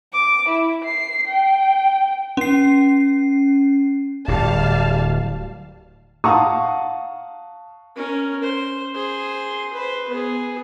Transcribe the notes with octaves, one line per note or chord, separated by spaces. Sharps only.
D6
E4
C7
G5
C#4 C7
D1 G3 F5 A5
F5 F#5 A5 A#5 C#6 D#6
C#4 A#4
C5
G#4 C5
B4 C5
B3 G#4